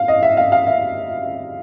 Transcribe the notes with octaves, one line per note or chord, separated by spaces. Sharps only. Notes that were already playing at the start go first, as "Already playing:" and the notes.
Already playing: F5
D#5
E5
F5
F5
E5